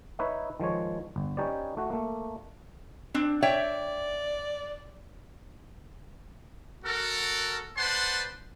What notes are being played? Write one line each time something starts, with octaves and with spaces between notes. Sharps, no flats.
D#4 B4 C#5 E5
D#3 F3 G#3 C#5
G1
C#4 D#4 G4 B4 C#5 D5
A3 F#4
A3 A#3
C4 D4
C#5 D5 E5 G5
F#4 A4 A#4
B4 C5 D5 F#5 A5 C6